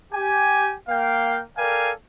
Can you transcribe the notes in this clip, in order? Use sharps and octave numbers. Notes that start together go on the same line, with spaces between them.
G4 G#5
A#3 F5 G5
A4 A#4 D5 F5 G5 G#5